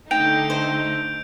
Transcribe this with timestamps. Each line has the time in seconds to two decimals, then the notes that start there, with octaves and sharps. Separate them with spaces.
0.11 D3 A3 D#4 G5 G6 D7 F7
0.50 C5